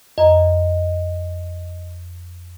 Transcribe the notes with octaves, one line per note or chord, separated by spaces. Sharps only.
F2 D#5 A#5